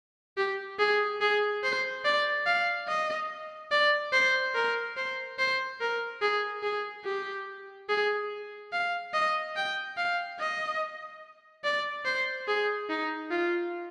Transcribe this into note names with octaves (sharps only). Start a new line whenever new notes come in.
G4
G#4
G#4
C5
D5
F5
D#5
D5
C5
A#4
C5
C5
A#4
G#4
G#4
G4
G#4
F5
D#5
G5
F5
D#5
D5
C5
G#4
D#4
F4